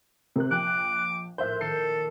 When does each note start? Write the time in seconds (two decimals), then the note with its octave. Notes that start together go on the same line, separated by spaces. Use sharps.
0.36 C3 C4 A#4 F#6
0.51 A#1 G5 D6 F#6
1.38 A#1 A2 C5 E5 F#6 G6
1.61 D#3 A4 C7